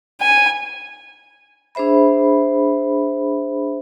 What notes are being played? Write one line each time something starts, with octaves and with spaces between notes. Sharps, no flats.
G#5
D4 G#4 C5 E5 B5